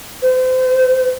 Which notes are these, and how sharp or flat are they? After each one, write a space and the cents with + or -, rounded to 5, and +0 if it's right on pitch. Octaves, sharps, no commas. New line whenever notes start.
C5 -35